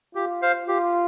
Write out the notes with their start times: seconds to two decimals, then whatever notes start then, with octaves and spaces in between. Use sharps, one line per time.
0.15 F4 G4
0.42 C5 F5
0.68 F4 G4